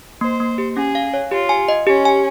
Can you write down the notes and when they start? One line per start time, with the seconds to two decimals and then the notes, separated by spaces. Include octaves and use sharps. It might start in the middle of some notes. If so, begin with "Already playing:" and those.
0.21 A#3 C5
0.40 A#3
0.58 G4
0.77 C#4 G#4
0.95 F5
1.14 C#5
1.31 F4 G4
1.49 G#5
1.69 D#5
1.87 C#4 G4
2.05 G#5